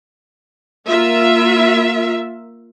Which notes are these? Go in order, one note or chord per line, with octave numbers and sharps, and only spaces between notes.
A#3 F4 A#4 E5